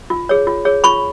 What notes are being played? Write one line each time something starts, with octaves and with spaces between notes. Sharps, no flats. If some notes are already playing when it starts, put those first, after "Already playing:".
F4
G#4 C#5
F4
G#4 C#5
F4 B5 C#6